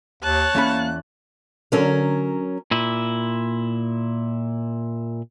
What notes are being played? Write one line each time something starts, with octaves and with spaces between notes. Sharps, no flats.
D#2 C#5 A5 F#6
E2 A#3 C#4 B5
D3 F#3 C#4 A#4
A#2 E4